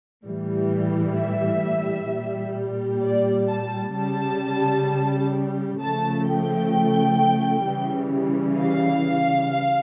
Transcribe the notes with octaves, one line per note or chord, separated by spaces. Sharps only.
A2 E3 G3
E5
A#2 G3
D5
A5
C#3 G3 A5
C#3 F3 A3 A5
G5
C#3 E3 G3
F5